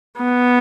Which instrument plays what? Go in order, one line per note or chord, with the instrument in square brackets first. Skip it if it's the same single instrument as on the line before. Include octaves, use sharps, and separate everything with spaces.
[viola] B3